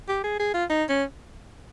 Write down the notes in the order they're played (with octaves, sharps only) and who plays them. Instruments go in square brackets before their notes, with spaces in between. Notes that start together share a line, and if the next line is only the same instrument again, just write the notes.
[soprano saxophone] G4
G#4
G#4
F4
D#4
C#4